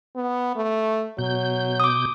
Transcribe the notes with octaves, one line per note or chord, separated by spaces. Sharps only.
B3
A3
B2 F#3 G6
D6 D#6